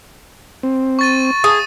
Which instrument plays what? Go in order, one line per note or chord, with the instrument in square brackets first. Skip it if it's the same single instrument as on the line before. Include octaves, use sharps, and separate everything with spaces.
[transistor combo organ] C4
[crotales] C#6 A6 D#7
[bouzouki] G#4 [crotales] D#6